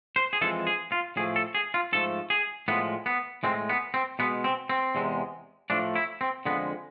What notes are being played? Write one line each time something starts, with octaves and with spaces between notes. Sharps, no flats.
C5
G#4
F2 E3 G#3 A4
G#4
F4
A2 F3 A3 G#4
A4
G#4
F4
G#2 F3 A3 A4
G#4
A2 F3 G#3 B3
B3
A2 G#3 C4
B3
C4
B2 G#3 B3
C4
C4
E2 C3 G#3
A2 F3 A3 D4
E4
C4
F2 D3 F3 G#3 B3